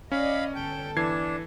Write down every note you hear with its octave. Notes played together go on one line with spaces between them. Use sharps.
C#4 D5 D#5 F5 B5
G1 A4 G5
E3 D4 G#6 C7